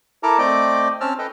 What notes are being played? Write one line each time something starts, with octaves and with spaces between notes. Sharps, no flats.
E4 A4 A#4 A5 A#5 D6
A3 C4 D5 D#5 G5 D6
C4 C#4 A5 E6 F6
A4 B4 D#5 G5